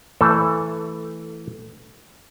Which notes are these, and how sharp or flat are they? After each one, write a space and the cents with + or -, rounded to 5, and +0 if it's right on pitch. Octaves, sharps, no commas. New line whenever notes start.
E3 +0 A3 +15 A4 +0